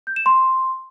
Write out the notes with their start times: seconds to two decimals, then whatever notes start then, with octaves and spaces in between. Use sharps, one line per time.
0.07 G6
0.16 E7
0.26 C6